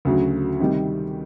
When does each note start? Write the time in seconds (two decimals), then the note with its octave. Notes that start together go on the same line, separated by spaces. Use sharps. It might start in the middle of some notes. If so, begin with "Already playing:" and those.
0.05 D2 C#3 F#3
0.60 C3 D#3 G3